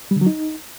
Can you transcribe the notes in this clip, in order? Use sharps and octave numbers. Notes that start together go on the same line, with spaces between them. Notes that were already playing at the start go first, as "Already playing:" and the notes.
G3
D3
F#3
D#4